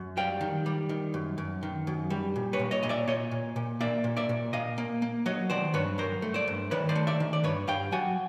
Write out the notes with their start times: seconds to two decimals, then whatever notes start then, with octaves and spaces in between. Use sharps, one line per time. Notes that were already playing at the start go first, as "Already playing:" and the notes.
Already playing: F#2
0.17 G3 F5 G5
0.41 D#3
0.66 G3
0.89 D#3
1.14 F#2
1.38 F#2
1.63 D#3
1.87 F#2
2.10 G3
2.36 A#2
2.53 B4 C#5
2.59 A#2
2.71 C#5 D#5
2.83 A#2 D#5
2.89 D5 E5
3.07 A#2 C#5 D#5
3.31 A#2
3.56 A#2
3.81 A#3 D5 E5
4.04 A#2
4.17 D5 E5
4.29 A#2
4.53 A#2 D#5 F5
4.78 A#3
5.02 A#3
5.26 F#3 C#5 D#5
5.50 D#3 C5 D5
5.74 G2 B4 C#5
5.98 F#3 A#4 C5
6.22 A3
6.34 C5 D5
6.48 G2
6.71 D#3 B4 C#5
6.89 C5 D5
6.95 A3
7.07 D5 E5
7.20 D#3
7.33 D5
7.44 G2 B4 C#5
7.67 G2 F5 G5
7.92 F#3 F#5 G#5